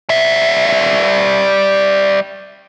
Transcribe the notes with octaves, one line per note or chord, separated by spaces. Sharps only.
G3 E5